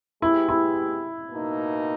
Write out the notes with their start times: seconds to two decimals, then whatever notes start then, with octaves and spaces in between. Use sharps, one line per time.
0.22 G#3 B3 E4 G4
0.49 E4
1.31 B2 A#3 D#4